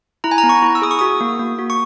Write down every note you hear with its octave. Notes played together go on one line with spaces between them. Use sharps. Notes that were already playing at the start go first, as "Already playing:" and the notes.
E4 A#5
G#5
A#5
B3
C#6
E4
E6
G#4 D#6
C#6
F#4 D#6
A#3
A#3
F#4
C#6